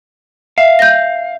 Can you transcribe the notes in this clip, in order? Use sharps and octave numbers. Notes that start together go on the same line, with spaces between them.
E5 F5
G6 A#6